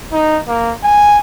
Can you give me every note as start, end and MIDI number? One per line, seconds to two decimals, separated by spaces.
0.12 0.39 63
0.48 0.73 58
0.83 1.18 80